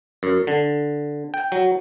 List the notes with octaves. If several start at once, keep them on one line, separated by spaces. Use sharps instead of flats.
F#2
D3
G5
F#3